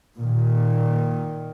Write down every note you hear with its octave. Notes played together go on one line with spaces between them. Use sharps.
A#2 D#3